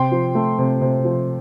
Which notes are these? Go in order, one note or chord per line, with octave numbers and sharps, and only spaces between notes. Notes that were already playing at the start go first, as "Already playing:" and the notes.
Already playing: C3 G5 C6
F3
A3
C3
C3
F3